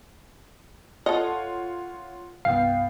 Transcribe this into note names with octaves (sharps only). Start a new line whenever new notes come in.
F4 A4 C#5 D#5 F#5
C2 G2 B3 F5 G5 C7